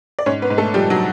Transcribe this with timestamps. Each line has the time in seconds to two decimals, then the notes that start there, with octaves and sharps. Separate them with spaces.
0.19 D5
0.26 G#2 C#4 C#5
0.42 B3 B4
0.50 G#2
0.58 A3 A4
0.74 F3 G3 G4
0.90 F#3 F#4